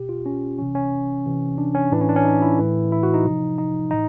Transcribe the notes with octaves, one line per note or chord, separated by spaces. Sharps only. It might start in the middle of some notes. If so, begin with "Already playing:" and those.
Already playing: B2 G4
F4
C#4
C3 E3 C#4
C#4
C3 E3
D4
C#4
A2 E3 D4
C#4
D4
C#4
D#4
E4
A2 E3
E4
F#4
D#4
C3 F3
D#4
A2 E3 D#4